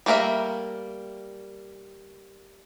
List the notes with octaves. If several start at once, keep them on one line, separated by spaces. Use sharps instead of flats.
G3 A3 A#3 A#4 E5